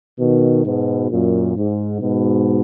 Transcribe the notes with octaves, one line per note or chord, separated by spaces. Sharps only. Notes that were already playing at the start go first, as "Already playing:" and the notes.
B2 D#3
G#2 B2
F#2 A#2
G#2
G#2 B2